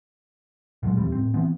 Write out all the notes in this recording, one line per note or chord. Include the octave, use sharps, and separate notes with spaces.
A#2 F#3 G#3
D#1 E2 G3 C4
A2 C4
E3 B3 C4